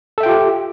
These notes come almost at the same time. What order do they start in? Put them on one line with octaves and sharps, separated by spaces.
A4 E5 G5 F4 G4